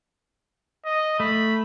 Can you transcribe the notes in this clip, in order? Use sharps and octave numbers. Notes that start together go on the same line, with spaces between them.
D#5
A3 B5